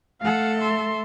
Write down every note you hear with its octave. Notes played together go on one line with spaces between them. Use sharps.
A3 A4 F5 F#5
E5 C6